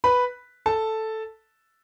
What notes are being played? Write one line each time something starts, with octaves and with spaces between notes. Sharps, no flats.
B4 B5
A4 A5